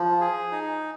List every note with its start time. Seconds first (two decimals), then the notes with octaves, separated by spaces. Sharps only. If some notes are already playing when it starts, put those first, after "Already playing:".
Already playing: F3
0.21 G#4
0.52 D#4